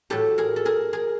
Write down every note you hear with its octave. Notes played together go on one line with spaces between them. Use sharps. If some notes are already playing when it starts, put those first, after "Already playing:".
A2 F#3 G4 A4
G#4 A#4
A4
G#4 A#4
G#4 A#4